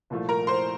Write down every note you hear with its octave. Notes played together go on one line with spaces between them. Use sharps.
C2 A#2 F3 A3
A#4 A#5
C5 C6